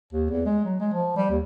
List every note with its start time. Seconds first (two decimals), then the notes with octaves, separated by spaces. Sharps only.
0.13 D#2
0.30 E2
0.46 G#3
0.65 F#3
0.80 G#3
0.93 F3
1.16 G3
1.30 D#2